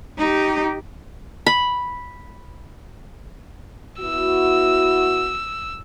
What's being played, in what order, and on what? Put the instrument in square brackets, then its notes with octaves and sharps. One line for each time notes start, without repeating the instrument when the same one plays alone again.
[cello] D#4 G4
[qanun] B5
[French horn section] B3 E4 F#4 [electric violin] E6